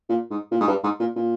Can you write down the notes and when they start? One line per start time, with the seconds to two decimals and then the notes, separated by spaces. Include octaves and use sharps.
0.09 A#2
0.30 G#2
0.51 A#2
0.60 G#2
0.68 G2
0.83 G#2
1.00 A#2
1.16 A#2